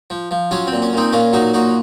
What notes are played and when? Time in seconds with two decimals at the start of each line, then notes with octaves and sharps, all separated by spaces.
0.10 F3
0.31 F3
0.51 F#3 C#4 F4
0.67 C4
0.72 A#2
0.82 C#4
0.93 A#2 C4 D#4
1.12 A#2 C#4 F4
1.33 F#3 D#4 F#4
1.53 A#2 D#4 F#4